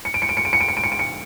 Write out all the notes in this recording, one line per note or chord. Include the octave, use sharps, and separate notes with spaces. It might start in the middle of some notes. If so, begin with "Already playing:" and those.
C#7
D7
C#7
D7
C#7
D7
C#7
D7
C#7
D7
C#7
D7
C#7